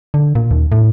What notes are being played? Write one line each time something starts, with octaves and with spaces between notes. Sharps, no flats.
D3
A#2
D#2
A2